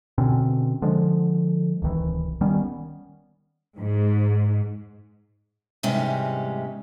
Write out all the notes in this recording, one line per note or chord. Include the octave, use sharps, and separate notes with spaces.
B2 D3 C4 C#4
D3 F3 G#3
D1 C2 D#3 E3
D#3 G3 B3 C#4
G#2
E2 G#2 C3 G3 G#3 C#4